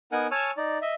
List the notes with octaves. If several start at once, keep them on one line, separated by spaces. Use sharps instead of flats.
B3 D#4 A#4 F#5 G#5
C#5 G#5 A5 C#6 E6 F6
D#4 D5
D#5 E5